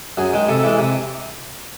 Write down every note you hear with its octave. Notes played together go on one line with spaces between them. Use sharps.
F#2 G#4
D#3 G#3
C3 A4
E3 G#3
C3